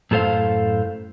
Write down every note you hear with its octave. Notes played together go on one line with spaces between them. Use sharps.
F#2 A2 A4 C5 F5